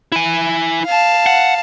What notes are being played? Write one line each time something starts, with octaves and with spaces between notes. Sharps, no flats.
E4 G#5
F5 A5
F#5